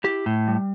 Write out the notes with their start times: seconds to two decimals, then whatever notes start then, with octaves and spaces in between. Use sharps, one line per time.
0.04 E4 G4
0.26 A2
0.48 G3